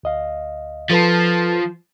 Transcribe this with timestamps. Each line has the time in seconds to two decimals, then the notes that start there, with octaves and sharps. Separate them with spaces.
0.03 D2 D#5 F5
0.91 F3 A4 B4 A5